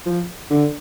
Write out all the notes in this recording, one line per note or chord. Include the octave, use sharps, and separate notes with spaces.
F3
D3